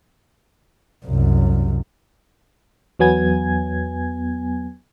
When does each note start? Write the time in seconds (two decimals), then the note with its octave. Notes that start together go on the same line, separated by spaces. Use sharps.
1.06 C2 F#2
2.99 E2 F#3 B3 G#5 G#6